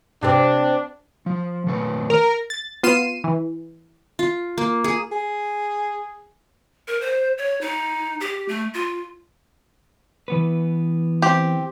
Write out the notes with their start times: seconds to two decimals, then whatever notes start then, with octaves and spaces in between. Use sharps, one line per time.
0.23 C3 C4 D4
1.26 F3
1.67 D#3 A3 B4
2.10 A#4
2.50 A6
2.83 B3 F4 C7 D#7 E7
3.24 E3
4.19 F4
4.58 A#3
4.84 G#4
5.12 G#4
6.88 A#4
7.01 C5
7.38 C#5
7.61 D#4
8.21 G4
8.49 A3
8.74 F4
10.28 E3 B3 B4
11.22 C4 G4